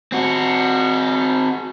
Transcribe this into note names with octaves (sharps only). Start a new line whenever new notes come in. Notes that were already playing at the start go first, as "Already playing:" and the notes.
C4 F#4